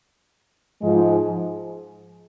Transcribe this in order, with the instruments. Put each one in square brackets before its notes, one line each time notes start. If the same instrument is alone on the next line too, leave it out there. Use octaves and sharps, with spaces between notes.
[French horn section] G#2 F3 G#3